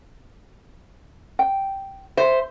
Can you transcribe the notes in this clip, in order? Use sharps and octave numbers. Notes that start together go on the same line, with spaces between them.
G5
C5 E5